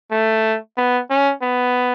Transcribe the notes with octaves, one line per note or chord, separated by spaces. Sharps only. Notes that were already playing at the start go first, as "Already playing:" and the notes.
A3
B3
C#4
B3